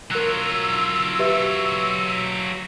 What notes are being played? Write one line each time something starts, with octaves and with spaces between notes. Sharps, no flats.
F#3 F4 A#4 E6 F#6
G4 B4 E5